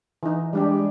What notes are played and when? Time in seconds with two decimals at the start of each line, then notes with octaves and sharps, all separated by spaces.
0.23 E3 D#4
0.53 G3 G#3 D4 G4